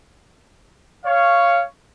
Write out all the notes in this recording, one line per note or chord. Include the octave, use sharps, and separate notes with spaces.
C#5 F5